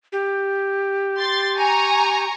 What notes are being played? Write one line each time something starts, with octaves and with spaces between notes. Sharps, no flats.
G4
C6 A6
G#5 A#5 C#6